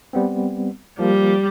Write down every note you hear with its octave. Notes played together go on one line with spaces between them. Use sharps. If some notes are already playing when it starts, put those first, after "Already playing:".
G3 B3 C4
F3 G3 A#3